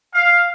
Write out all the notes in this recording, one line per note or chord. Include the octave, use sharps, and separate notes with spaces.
F5